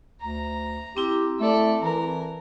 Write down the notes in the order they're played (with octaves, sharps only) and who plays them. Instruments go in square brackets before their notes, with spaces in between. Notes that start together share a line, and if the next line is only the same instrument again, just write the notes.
[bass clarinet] D2 [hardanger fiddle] A#5
[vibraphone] C4 E4 [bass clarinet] G4
[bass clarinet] A3 [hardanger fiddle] A4 D5
[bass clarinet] E3 [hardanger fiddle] A#4